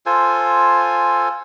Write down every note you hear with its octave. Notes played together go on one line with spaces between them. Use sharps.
F4 A4 C5 G#5